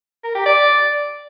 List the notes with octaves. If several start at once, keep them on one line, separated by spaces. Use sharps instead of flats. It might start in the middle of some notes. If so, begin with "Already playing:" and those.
A#4
G4
D5